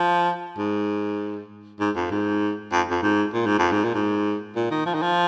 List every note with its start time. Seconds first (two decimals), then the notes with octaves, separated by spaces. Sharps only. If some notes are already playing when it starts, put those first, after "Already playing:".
Already playing: F3
0.58 G#2
1.80 G#2
1.96 F2
2.11 G#2
2.72 F2
2.91 F2
3.02 G#2
3.33 A#2
3.46 G#2
3.59 F2
3.72 G#2
3.84 A#2
3.94 G#2
4.56 A#2
4.71 D#3
4.86 F3
4.94 D#3
5.02 F3